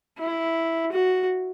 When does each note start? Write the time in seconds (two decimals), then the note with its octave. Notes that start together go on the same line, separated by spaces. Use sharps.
0.18 E4
0.92 F#4